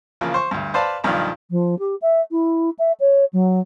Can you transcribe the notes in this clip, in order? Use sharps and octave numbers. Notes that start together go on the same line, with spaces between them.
C#3 E3 F3 A#3
C5 C#6
D2 G2
B4 C5 D5 F5 A5 B5
B1 G2 D#3 F3 D5 F6
F3
G4
E5
E4
E5
C#5
F#3